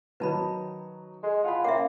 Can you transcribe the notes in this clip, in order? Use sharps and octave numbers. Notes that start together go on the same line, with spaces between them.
D#3 F#3 D#4 B4 A5 B5
G#3
F4 F#5 G#5 B5
A#3 C#4 E5 F#5 G5 B5